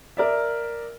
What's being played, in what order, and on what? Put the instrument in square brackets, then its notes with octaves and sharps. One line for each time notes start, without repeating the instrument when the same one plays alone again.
[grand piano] A#4 D5 E5